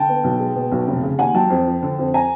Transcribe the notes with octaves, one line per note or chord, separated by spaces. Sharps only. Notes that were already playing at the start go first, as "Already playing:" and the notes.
Already playing: D3 G5 A5
B3
B1
G#3
B2
B1
F1
C#3
D#2 F#5 G#5
F#3 G5 A5
F2
F3
D3
F2
G#5 A#5